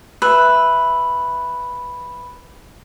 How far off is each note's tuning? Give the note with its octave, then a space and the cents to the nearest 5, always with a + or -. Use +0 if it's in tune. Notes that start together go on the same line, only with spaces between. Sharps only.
B4 +0 E5 +0